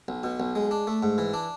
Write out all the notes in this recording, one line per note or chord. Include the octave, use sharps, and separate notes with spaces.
B1
B2
B1
G#3
D4
A3
G#2
E3
D4